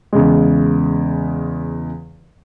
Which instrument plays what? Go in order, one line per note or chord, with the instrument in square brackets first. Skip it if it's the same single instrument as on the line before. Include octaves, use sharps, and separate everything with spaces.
[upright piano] E2 C#3 G#3